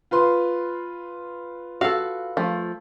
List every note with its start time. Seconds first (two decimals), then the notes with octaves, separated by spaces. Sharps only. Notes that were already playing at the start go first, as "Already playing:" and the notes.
0.11 F4 B4 C6
1.81 F#4 A4 F5
2.37 F3 A3